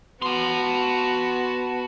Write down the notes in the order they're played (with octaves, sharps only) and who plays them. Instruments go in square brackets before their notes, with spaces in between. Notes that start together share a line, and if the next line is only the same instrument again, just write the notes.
[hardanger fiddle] B3 F#4 [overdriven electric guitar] A5 C6